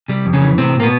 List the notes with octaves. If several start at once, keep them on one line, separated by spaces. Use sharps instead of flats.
C3 G3
F2
C#3 C#4
E3
A2 C3 C4
A2 A#3
B2 B3